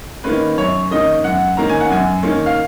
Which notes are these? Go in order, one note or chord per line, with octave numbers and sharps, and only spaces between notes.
D#3 A#3 C#4 B4
F#2 C#5
D#3 A#3 C#4 D#5
F#2 F#5
D#3 A#3 C#4 A#5
G#5
F#5
F#2 G#5
D#3 A#3 C#4
F5